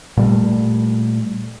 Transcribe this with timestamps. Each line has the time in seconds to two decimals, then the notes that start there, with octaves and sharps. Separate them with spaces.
0.17 A#2 G3 A3